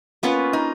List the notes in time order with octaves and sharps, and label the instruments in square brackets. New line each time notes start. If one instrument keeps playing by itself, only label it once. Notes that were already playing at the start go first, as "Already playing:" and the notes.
[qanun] A#3 C#4 F4 B4 [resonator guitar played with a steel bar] B3
[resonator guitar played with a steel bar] D#4